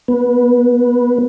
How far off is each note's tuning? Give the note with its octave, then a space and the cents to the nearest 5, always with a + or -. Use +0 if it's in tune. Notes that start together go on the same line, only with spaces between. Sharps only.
B3 -15